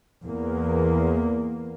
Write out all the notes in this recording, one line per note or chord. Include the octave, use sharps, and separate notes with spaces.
E2 A#3